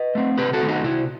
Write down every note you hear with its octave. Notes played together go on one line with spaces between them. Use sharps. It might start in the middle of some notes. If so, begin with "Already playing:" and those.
Already playing: B4 D#5
A3 C4
C3 G4 B4
F#4 A4
D#3 A3 C4
D#4 F#4
C3 E4